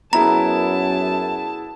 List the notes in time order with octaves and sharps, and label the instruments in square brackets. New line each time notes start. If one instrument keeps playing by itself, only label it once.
[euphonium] F#2 [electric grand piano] B3 E4 G#4 [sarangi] A5 [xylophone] A#5